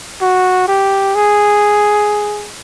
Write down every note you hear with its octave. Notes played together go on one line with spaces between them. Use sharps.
F#4
G4
G#4